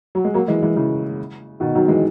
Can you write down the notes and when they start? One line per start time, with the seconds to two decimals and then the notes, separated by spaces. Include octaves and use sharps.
0.15 F#3
0.25 G#3
0.34 F#3 A#3
0.48 E3 G#3
0.63 E3 G#3
0.76 C#3 E3
1.60 B2 D#3
1.75 D#3 F#3
1.88 E3 G#3